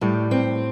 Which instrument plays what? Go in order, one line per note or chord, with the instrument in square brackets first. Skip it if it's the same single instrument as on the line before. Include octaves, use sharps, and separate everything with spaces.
[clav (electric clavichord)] A2 [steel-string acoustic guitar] G3
[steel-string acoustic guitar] C4